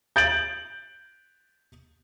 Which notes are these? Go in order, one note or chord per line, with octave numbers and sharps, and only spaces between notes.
G6 A6 D7 F#7